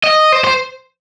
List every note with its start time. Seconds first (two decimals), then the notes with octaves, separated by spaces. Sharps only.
0.04 D#5
0.32 C5
0.44 C5